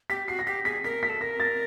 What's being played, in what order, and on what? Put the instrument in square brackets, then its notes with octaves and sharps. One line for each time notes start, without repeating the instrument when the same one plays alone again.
[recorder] G4 [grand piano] B6
[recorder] F#4 [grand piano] C7
[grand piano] A#6
[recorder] G4 [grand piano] B6
[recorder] G#4 [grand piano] B6
[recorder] A#4 [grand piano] B6
[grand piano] B6
[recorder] A4
[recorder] A#4 [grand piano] A#6
[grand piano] A6